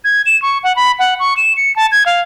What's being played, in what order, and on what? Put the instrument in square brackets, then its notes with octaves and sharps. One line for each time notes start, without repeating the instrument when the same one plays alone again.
[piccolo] G#6
E7
C#6
F#5
B5
F#5
C#6
E7
C#7
A5
G#6
F5